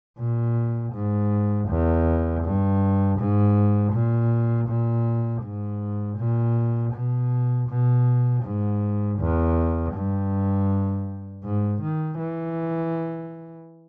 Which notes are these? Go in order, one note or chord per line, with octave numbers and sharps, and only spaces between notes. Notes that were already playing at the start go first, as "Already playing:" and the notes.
A#2
G#2
E2
G2
G#2
A#2
A#2
G#2
A#2
B2
B2
G#2
E2
G2
G#2
D#3
E3